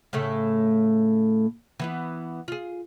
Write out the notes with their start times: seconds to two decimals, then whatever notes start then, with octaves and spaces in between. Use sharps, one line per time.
0.13 A2 C#3 A3
1.80 E3 B3 E4
2.48 F4 G#4